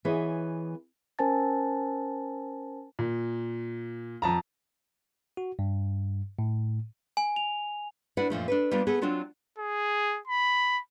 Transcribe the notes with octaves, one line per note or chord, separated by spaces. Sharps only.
E3 B3 G#4 C#5 D#5
C#4 A#4 C5 G#5 A5 A6
A#2
F2 A5 A#5
F#4
G2
A2
G#5
F7
D4 E4 B4 D5 F#5
F#2 A#2 F3 A3
D4 A4 B4
G3 A#3 B3 D4 F4
B3 G#4 A4
F#3 C4 D4 F4 F#4
G#4
B5